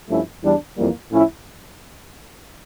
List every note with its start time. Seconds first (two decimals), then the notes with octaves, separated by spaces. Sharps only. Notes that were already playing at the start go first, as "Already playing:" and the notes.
0.08 G2 F3 A3 C#4 E4
0.42 E2 E3 G3 D4
0.77 F2 E3 G3 A#3
1.10 A2 F3 C#4 E4